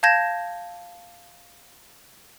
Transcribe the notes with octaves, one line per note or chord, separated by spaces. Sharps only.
F5 A5 G6 G#6 A#6 E7